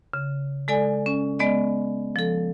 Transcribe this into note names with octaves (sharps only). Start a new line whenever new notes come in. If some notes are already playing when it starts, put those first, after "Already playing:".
C#3
G#3 A4 D5 G#5
C#4
G#3 B3 D5 D#5
F3 A4